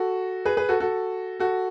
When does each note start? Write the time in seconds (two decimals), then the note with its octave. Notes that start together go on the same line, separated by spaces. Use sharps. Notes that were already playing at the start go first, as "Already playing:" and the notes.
Already playing: F#4 A4
0.45 G#4 B4
0.57 G#4 B4
0.69 F#4 A4
0.80 F#4 A4
1.40 F#4 A4